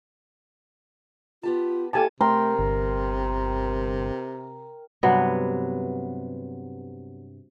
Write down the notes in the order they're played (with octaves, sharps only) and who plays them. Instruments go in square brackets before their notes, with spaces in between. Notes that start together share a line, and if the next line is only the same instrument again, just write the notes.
[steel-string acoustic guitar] B3 G4 A5 [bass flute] F4
[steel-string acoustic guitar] A#3 E4 A4 [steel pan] G4 G#5 A5
[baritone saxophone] C3 [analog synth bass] A3 [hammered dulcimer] A#4 G5 C6
[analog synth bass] G1
[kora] G2 C3 F#3 B3